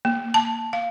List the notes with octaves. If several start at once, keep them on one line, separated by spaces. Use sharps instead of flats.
A#3
A5
F5